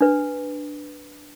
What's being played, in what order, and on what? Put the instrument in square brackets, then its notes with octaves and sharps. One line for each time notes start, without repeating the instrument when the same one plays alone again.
[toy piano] D4 B4